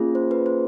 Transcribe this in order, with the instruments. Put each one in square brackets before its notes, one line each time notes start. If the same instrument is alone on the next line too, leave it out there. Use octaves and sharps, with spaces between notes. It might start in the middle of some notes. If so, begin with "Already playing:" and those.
Already playing: [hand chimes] A#3 C#4 F4 G#4
C5
B4
C5